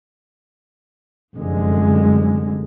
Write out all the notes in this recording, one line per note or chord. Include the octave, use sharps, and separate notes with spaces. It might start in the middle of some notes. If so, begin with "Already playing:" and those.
F1 F#2 D3 G#3